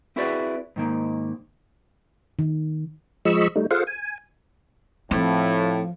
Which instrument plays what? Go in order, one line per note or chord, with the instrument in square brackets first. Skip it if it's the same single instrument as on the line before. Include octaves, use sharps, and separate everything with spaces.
[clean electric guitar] C4 E4 F#4 G#4 B4 D5
G#2 D#3 A#3
[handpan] D#3
[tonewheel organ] F3 G#3 D#5 B5 C#6 E6
G3 A3 D#4
F4 G#4 A4 C5 F5 F#5
G#5
[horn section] A2 [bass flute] F3 [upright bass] C4